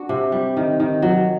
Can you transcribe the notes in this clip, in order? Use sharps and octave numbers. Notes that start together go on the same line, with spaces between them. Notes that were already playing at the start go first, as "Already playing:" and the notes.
Already playing: D4 F#4
C3
G3
D#3
D#3
F#3